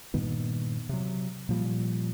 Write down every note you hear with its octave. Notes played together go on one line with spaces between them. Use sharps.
G2 A#2 D#3 B3
C3 F#3
A#2 F3 G3